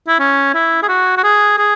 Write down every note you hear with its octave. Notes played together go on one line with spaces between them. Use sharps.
E4
C#4
E4
G#4
F#4
F#4
G#4
G#4